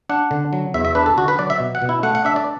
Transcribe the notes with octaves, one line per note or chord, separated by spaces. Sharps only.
D4 F#5
D3
F#3
E2 E5
E5
D4 B4
A4
D3 F#4
B4
F#3 D5
E5
B2
F#5
B2
E4
A3 F#5
F#5
D4 E5
D5